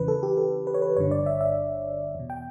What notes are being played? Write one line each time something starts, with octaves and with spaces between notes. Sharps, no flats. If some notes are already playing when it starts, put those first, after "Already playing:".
Already playing: E2 C#3 E3 B4
A4
G4
A4
B4
C#5
B4
G1 G2 D3 C#5
D5
E5
E5
E2 B2
G5